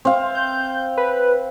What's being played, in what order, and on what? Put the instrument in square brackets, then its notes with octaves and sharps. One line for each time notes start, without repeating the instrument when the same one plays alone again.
[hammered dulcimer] C4 F5
[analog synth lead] G6
B4